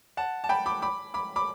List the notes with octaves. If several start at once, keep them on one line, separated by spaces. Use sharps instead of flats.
F#5 A5
A5
G5 B5
B5 D6
B5 D6
B5 D6
B5 D6